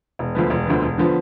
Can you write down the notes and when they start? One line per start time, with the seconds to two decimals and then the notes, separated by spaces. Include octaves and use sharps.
0.19 E1
0.35 D2 D3 F3 B3
0.50 E1
0.66 D2 D3 F3 B3
0.82 E1
0.98 D3 F3 B3